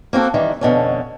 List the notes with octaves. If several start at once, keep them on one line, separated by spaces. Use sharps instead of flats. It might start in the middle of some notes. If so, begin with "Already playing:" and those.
A#3 C4 F#4 A4
D#3 E3 G3
F2 B2 D3 C#4